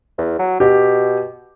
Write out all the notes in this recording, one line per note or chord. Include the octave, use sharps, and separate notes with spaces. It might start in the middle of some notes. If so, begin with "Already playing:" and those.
E2
F#3
B2 G4